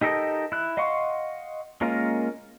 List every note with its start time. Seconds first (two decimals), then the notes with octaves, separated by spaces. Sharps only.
0.01 D#4 G4 A4 A#4 D#5
0.52 E4 F#6
0.77 D#5 F5 F#5 C6 C#6
1.81 G#3 A#3 C#4 F4 A#4